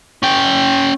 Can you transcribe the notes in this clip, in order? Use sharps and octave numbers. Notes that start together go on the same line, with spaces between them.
C#4 G5